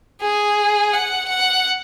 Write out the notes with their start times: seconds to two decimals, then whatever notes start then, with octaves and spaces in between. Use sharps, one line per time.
0.22 G#4
0.93 F#5
1.29 F#5